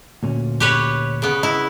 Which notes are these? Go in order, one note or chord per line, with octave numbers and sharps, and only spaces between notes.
D2 A#2 C#4
G4 B4 C#5
C#3 B3
E4 D#5